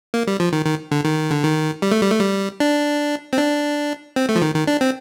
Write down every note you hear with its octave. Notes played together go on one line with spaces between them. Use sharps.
A#3
G3
F3
D#3
D#3
D3
D#3
D3
D#3
G3
A3
G3
A3
G3
D4
C4
D4
C4
A3
F3
D#3
D#3
D4
C4